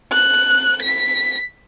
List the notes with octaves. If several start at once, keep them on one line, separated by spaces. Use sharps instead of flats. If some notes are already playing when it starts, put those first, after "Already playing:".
F#6
B6